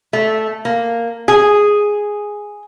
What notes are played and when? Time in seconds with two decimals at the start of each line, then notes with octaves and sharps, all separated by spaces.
0.13 A3
0.65 A#3
1.28 G#4